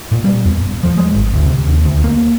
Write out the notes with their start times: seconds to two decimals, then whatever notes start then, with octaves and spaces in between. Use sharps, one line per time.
0.12 A#2
0.24 G3
0.45 E2
0.63 E1
0.83 F3
0.98 G#3
1.14 G#1
1.34 D2
1.46 C3
1.67 D#2
1.85 D2
2.04 A#3